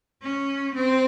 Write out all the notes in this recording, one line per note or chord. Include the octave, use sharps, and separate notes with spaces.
C#4
C4